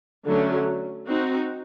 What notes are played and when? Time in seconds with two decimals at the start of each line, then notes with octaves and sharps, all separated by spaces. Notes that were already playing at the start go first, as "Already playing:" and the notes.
0.26 D3 F#3 A3 C#4
1.07 C4 D#4 F#4